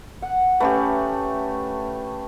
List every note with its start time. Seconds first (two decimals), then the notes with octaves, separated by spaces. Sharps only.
0.22 F#5
0.60 A3 C#4 G4 B4